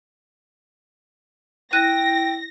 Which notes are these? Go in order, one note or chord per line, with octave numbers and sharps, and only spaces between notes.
E4 G5 F#6 A#6 D#7